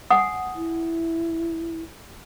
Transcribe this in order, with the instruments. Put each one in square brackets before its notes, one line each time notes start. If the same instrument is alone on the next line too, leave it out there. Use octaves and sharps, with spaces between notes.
[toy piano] F#5 G#5 D#6
[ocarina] E4